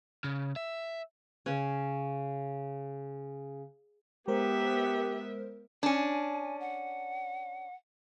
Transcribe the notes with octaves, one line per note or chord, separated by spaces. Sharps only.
C#3
E5
C#3 C#4
G#3 B3 G4 A#4 C5 E5
C#4 D4 G#5
F#5